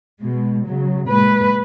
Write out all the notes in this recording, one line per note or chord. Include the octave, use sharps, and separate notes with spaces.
B2 G#3
C#3 F#3
A#2 G#3 B4